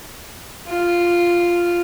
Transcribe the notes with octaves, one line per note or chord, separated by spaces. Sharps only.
F4